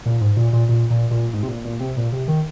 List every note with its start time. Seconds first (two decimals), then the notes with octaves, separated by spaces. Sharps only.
0.06 A#2
0.21 G#2
0.37 A#2
0.53 A#2
0.69 A#2
0.90 A#2
1.11 A#2
1.33 G#2
1.43 C3
1.48 A#2
1.65 A#2
1.80 C3
1.97 A#2
2.12 C3
2.28 D#3